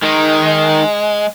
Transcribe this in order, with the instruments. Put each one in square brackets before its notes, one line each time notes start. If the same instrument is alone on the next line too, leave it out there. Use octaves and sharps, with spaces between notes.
[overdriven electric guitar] D#3 D#4 [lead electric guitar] G#3